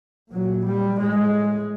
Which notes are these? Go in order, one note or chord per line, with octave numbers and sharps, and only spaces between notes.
A#2 F#3
G3
A2 G#3